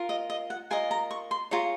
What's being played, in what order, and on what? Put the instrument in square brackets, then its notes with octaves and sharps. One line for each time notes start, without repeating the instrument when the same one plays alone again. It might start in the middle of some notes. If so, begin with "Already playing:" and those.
Already playing: [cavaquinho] F4 A#4
D#5
D#5
F#5
F4 A#4 D#5 G#5
A#5
C#6
C6
F4 G#4 C#5 A#5